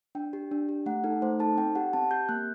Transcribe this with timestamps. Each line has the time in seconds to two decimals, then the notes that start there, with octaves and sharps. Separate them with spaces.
0.15 D4 G5
0.33 G4
0.51 D4
0.69 G4
0.86 A3 F#5
1.04 D#4 A4
1.22 A3 C5
1.39 D#4 A4 A5
1.57 C4 G5
1.75 G4 F#5
1.93 C4 A5
2.11 G4 G6
2.29 A#3 F#6